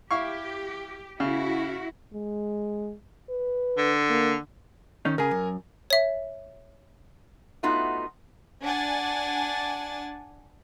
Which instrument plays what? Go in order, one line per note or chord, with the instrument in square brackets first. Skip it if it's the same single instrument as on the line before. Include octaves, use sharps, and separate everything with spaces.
[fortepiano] E4 F5 C#6 [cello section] G4
[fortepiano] C#3 [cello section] E4 F#4
[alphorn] G#3
B4
[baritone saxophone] D3
[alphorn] A#3
[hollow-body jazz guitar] D#3 C#4 D#4
[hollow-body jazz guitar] C#3 G#4 [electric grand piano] A#4 G#5
[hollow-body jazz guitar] F#2
[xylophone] C#5 E5
[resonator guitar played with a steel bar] A3 B3 D#4 F4 F#4
[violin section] D4 F#5 G#5 A6